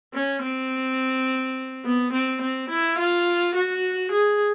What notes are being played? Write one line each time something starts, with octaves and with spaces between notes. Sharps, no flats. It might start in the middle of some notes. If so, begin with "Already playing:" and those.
C#4
C4
B3
C4
C4
E4
F4
F#4
G#4